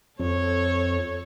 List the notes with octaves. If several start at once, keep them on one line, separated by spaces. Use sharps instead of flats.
F2 A4 C#5